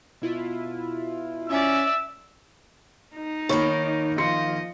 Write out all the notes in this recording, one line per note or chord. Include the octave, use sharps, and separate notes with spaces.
B2 E4 F4
C#4 D5 E5 E6
D#4
D#3 A#3 C#5 B5 C#6
F3 D#5 F5 C6 C#7